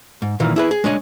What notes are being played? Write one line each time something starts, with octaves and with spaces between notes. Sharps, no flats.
G#2
A#2 D#3 E3 A#3
E4 G#4 B4
G#4
G#3 D4 C#5 D#5